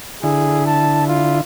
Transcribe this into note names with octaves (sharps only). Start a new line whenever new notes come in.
D3 E4 G#4
A5
F4